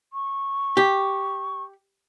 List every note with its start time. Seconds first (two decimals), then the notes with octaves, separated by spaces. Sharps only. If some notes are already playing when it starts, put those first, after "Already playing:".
0.13 C#6
0.77 G4